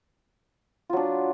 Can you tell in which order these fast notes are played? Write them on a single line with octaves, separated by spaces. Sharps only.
F4 F#3 D4